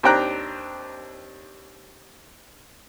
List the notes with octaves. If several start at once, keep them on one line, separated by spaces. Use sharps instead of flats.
D#2 C4 D4 G5 A#5 F#6